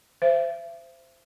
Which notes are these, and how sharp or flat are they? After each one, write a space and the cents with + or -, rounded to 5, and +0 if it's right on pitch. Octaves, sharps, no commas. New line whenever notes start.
C5 -10 E5 +35